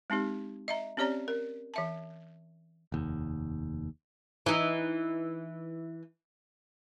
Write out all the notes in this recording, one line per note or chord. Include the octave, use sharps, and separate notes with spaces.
G#3 C4 D#4 G4
D#5 E5 A#5
C4 C#4 G4 C#5 D5 A#5
A#4
E3 E5 A5
F1 D#2
E3 D#4